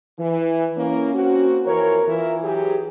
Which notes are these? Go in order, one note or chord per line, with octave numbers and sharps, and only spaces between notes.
E3
A#3 C#4 E4
A#3 C4 F#4
F2 E3 A#4 C#5
E3 E4 F4 A#4
F#3 G4 G#4